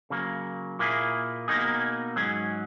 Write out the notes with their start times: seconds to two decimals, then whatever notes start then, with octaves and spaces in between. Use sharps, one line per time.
0.10 C#3 F#3 A#3
0.79 A#2 A#3 E4 G#4
1.48 B2 A#3 D#4 G#4
2.16 G#2 F#3 C#4 G#4